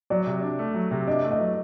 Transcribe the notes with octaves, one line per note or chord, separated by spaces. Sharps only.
F#3 D5
C3
D4
A3
F#3
C3
D4 D#5
A3
D#5
F#3